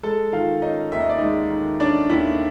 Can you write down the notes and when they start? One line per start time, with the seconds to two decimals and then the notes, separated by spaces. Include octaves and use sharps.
0.03 G#3 A4 A5
0.32 D#3 F4 F5
0.62 C#4 D#4 D#5
0.92 D#2 E5
1.01 D#5
1.10 D5
1.18 G#3 D#4 D#5
1.50 D#3
1.80 C#4 D4 D5
2.09 D#2 E4 E5